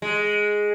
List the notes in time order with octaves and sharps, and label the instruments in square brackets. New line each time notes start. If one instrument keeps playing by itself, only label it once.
[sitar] G#3